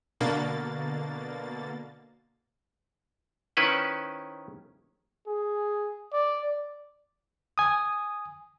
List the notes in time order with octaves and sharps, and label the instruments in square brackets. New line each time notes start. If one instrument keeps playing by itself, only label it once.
[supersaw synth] B2 D3 A#3 A6
[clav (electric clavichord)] D#3 C#4 E4 B4 C5
[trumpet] G#4
D5
[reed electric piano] G#5 D#6